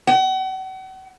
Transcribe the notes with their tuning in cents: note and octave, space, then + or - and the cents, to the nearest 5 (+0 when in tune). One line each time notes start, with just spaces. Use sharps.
F#5 +40